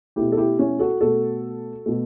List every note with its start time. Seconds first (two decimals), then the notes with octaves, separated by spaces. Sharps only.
0.16 B2 A3 E4 G4
0.32 A4
0.37 E4 G4
0.59 C#4 E4
0.79 F#4 A4
1.01 B2 A3 F#4 A4
1.86 B2 A3